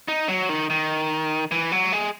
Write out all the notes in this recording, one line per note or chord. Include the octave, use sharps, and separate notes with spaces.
D#4
F#3
D#3
D#3
E3
F#3
G#3